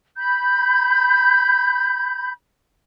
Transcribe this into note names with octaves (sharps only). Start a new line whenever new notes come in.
B5 G6